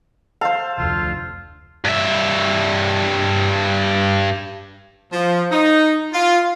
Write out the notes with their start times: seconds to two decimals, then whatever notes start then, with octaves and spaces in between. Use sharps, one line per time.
0.41 A4 C5 F5
0.78 F1 D2 F4
1.85 G2 E5
5.13 F3
5.51 D#4
6.13 F4